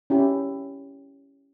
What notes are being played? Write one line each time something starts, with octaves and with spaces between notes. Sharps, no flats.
C#4 E4 G4